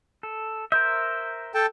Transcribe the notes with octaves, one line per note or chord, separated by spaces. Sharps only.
A4
A#4 C5 E5 G6
A4 G5 A5